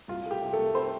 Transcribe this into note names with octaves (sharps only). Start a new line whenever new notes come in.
C2 F4
A3
G4
C3
A3 A4
C2
C4 C5